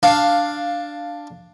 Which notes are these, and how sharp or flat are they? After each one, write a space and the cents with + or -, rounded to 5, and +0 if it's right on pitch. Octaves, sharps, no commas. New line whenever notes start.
D4 +5 F5 +0